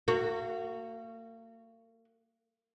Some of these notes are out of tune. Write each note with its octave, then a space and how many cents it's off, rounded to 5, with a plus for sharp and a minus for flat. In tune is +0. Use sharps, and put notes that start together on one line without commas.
A#3 -40 F#4 +0